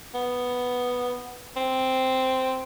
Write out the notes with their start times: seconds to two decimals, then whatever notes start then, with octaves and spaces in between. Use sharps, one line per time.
0.15 B3
1.57 C4